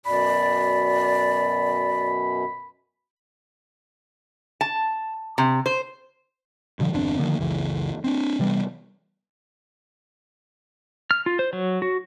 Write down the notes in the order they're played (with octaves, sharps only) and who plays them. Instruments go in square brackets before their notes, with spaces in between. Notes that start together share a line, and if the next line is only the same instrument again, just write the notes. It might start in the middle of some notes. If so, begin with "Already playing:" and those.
[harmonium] F#2 B2 [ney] D5 [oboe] B5
[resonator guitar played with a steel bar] A5
C3
C5
[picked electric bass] G2 B2 D3 F3
G1 E2 C4 D4
D3 D#3 F3 A#3
F#1 C#2 E3
C4 D4
C3 E3 G3 B3
[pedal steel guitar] F6
F4
C5
F#3
F#4